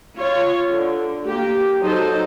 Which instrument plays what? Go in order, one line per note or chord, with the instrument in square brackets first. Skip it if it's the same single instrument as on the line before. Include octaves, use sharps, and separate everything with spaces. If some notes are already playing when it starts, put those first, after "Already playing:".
[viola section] F4 C#5
D3
A#3 G4
F#3 D#4 A4 C5